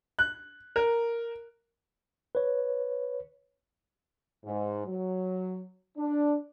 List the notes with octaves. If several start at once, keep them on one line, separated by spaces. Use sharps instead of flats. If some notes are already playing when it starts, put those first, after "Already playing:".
F#6
A#4
B4 C#5
G#2
F#3
D4